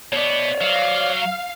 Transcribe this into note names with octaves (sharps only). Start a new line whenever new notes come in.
B2 B3 C#5 D5
F#3 F5